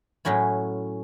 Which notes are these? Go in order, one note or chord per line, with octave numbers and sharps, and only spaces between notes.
A2 F#3 C#4 E4